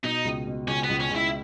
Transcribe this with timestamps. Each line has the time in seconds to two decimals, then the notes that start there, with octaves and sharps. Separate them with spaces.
0.04 B2 D#4
0.25 C#2
0.47 B2
0.67 C#2 C#4
0.83 B3
0.89 C#2
1.00 C#4
1.10 C#2 E4